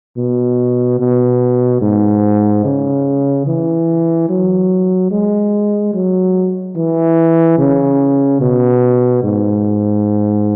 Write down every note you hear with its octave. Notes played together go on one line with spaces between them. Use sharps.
B2
B2
G#2
C#3
E3
F#3
G#3
F#3
E3
C#3
B2
G#2